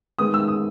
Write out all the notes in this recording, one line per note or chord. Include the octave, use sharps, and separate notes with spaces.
D#3 G#3 B3 D#6
E6
D#6